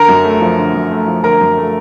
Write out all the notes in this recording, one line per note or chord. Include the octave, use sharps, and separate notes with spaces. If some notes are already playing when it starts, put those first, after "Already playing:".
Already playing: D3 A#4 A#5
F#2
A3
F3
D3
F#2
A3
F3
D3 A#4 A#5
F#2
A3